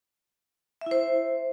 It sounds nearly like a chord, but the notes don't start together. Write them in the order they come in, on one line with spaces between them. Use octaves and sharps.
E5 E4 C5